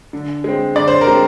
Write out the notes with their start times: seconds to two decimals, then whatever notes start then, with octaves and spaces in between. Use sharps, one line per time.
0.13 D3
0.44 G#3 C4
0.75 D3 D5
0.88 C5
1.01 A#4
1.07 G#3 C4